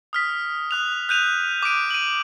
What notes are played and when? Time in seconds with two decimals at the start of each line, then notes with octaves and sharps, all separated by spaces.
0.13 D#6 F6 B6
0.71 D#6 F#6 F7
1.09 F#6 G6 D#7 F7
1.62 D6 F#6 D7 D#7
1.90 D#7 F#7